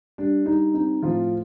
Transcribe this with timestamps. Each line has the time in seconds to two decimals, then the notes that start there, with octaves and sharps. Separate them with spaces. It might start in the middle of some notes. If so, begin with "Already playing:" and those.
0.18 G3 D4
0.46 G3 D#4
0.74 C4 D#4
1.02 A2 F3 F4